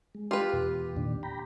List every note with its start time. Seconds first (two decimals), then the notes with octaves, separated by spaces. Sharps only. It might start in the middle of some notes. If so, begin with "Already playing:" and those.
0.15 G#3
0.31 F4 G4 B4
0.53 E2 B2
0.97 A#2 D#3 D4
1.23 G5 A#5 B5